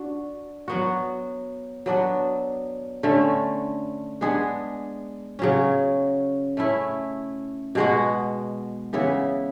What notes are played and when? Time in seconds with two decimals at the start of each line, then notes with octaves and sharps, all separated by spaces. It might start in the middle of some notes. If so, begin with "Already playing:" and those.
Already playing: D4 F#4
0.68 F#3 B3 F#4
1.86 F#3 B3 D4
3.03 D3 A3 C#4
4.21 G#3 B3 D4 G#4
5.39 C#3 F#3 C#4
6.57 A3 C#4 E4
7.75 B2 G#3 B3 F#4
8.93 C#3 E3 B3 E4